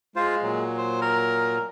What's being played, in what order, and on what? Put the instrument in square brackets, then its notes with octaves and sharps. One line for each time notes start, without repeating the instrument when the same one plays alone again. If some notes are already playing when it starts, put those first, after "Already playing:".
[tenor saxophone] G#3 [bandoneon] F4 C5
[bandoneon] A#2 F#3
[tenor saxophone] C5
A#4